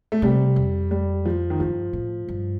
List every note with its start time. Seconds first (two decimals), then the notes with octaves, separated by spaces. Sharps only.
0.12 A3
0.22 C3 G3
0.56 F2
0.91 G3
1.25 F3
1.50 D#3
1.60 G2 F3
1.93 A2
2.28 G2